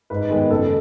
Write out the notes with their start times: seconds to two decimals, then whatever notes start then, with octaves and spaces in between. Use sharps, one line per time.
0.10 G#2 B4
0.30 D#3 G#3 B3
0.50 F#1 A4